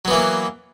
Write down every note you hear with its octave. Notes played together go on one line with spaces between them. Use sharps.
E3 F#3 A#3 B3